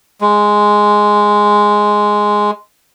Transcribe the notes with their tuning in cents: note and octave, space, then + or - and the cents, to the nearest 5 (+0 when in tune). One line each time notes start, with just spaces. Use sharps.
G#3 +0